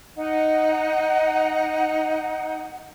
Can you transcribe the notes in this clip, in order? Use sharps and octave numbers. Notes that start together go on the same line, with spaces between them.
D#4 F#5